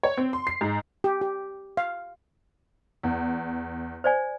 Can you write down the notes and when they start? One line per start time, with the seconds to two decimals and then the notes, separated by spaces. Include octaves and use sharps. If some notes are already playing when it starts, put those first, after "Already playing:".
0.03 C#5
0.17 C4
0.33 C6
0.47 C7
0.61 G#2
1.04 G4
1.21 G4
1.77 F5
3.03 E2
4.04 C5 D5 G#5